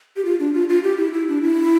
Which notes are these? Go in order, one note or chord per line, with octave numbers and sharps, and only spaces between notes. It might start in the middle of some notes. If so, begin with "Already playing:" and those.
G4
F4
D4
F4
F4
G4
E4
E4
D4
E4